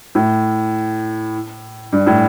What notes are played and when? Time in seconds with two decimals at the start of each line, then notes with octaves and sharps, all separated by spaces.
0.15 A2
1.92 G2
2.07 A2